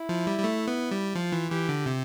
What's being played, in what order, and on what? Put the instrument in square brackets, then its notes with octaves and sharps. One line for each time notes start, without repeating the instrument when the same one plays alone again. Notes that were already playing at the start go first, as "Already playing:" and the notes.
Already playing: [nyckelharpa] E4
[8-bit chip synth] F3
G3
G3
A3
B3
G3
[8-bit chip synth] F3 [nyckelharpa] F4
[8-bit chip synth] E3
[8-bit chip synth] E3 [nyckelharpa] G4
[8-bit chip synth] D3
C3